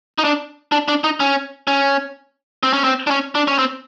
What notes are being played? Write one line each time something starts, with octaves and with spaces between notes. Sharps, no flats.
D#4
D4
D4
D4
D#4
C#4
C#4
C4
C#4
C4
D4
C#4
D4
C#4
C4